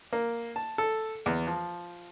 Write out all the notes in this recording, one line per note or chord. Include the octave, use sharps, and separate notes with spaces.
A#3
A5
A4
E2
F3